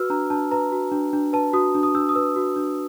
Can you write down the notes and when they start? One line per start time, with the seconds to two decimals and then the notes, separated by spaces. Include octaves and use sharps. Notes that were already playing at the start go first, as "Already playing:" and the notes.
Already playing: F#4 B4 E6 F6
0.10 D4 A#5
0.30 D4 A5
0.51 B4 A#5
0.72 F#4
0.92 D4
1.13 D4
1.33 B4 A5
1.53 F#4 D#6
1.75 D4
1.83 D#6
1.95 D4 E6
2.09 D#6
2.15 B4 E6
2.36 F#4
2.56 D4